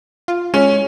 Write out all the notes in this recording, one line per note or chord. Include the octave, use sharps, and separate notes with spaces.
F4
G#3 C#4